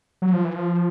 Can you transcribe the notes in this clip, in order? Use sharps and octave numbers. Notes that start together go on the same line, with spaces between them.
F#3
F3
E3
F3